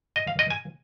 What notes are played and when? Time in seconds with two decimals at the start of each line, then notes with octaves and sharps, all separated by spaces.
0.16 D#5
0.27 F5
0.39 D#5
0.50 G#5